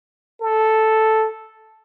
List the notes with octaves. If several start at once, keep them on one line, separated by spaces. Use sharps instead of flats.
A4